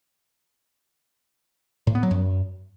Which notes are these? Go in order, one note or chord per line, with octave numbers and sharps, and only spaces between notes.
A2
B3
F#3
F#2